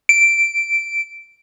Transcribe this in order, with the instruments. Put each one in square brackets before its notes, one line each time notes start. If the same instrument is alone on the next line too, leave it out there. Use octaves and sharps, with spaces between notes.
[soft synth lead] D7